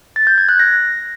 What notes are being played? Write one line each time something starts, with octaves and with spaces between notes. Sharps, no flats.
A6
G6
G#6
F#6
A#6